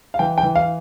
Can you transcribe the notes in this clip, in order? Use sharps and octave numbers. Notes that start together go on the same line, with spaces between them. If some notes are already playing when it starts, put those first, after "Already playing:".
F5
E3 G5
G5
E3
F5